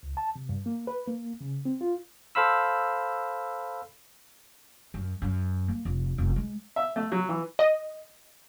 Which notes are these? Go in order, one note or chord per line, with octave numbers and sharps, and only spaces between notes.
C#2
A5
C3
G2
A#3
B4
A#3
C#3
C4
F4
A4 C5 F5 B5 E6
F#2
F#2
A#3
F1
F1
G#3
E5
A3
F#3
E3
D#5